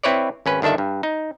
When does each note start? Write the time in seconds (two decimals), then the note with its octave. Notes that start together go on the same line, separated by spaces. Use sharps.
0.03 C4 E4 B4 C#5 D5
0.46 G#1 C#4 B4
0.62 G1 D#3 D4 A4 E5
0.78 G2
1.03 D#4